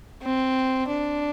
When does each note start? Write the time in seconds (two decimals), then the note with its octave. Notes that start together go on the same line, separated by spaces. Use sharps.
0.23 C4
0.88 D4